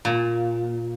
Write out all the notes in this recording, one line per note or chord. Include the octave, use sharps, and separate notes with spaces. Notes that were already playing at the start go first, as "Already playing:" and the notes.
A#2